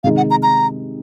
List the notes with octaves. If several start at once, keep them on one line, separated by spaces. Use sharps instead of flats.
C3 D#3 G#3 D#4 F5
F#5
A#5
A#5